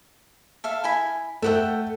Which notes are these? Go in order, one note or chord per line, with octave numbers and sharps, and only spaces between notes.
A4 E5 F5
E4 G#5 B5
A3 A4 E5 F#5 G5